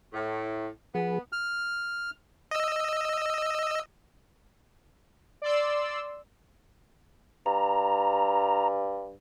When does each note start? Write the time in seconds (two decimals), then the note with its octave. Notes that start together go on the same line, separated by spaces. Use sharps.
0.13 A2
0.95 F3 B3 G#4
1.32 F6
2.51 D#5 E6
5.42 D5 C6 E6
7.46 G2 A#5